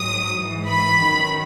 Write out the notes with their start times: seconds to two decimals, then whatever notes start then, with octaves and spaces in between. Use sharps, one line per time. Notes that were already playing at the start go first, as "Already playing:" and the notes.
Already playing: G#2 F#3 D#6
0.35 G#2 E3
0.67 B5
0.99 F#2 D#3 F#3